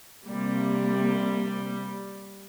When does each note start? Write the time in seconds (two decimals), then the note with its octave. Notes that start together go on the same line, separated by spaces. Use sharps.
0.25 C3 G3 A#3